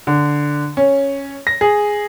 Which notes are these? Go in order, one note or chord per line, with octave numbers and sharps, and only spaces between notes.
D3
C#4
A#6
G#4